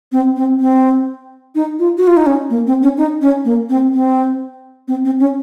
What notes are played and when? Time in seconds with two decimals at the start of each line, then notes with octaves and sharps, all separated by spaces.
0.12 C4
0.36 C4
0.60 C4
1.55 D#4
1.79 F4
1.98 F#4
2.07 F4
2.17 D#4
2.26 C#4
2.50 A#3
2.67 C4
2.83 C#4
2.98 D#4
3.21 C#4
3.45 A#3
3.69 C4
3.93 C4
4.88 C4
5.05 C4
5.20 C#4